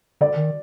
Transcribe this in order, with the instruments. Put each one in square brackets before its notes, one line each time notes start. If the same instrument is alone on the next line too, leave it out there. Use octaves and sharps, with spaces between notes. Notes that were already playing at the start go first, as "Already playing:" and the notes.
[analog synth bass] D3 [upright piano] D5
[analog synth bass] D#3